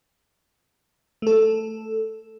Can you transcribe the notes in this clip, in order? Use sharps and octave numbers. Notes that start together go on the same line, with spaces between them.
A3 A4